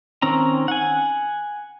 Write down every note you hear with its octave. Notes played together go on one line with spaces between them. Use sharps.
D#3 C4 C#4 A#5
F#5 G#5